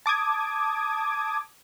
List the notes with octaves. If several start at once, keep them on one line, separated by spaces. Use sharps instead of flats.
A5 D6 D#6 G#6